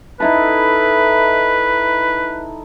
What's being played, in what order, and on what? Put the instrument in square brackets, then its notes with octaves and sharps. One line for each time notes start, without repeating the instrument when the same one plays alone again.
[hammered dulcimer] D#4 E4 A4 [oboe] B4